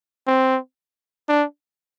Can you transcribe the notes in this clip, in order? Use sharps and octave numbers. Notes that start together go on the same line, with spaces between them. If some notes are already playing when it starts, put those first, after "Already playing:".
C4
D4